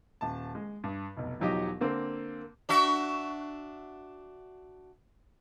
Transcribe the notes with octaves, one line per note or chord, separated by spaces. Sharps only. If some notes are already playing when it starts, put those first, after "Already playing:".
D#1 A5
G#3
G2
F1 B1
E1 F3 F#3 D#4 G4 D#5
D3 A#3 C4
D4 F#4 E5